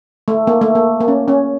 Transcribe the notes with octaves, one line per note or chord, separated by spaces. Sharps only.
A3
A#3
A3
A#3
A#3
C#4
C#4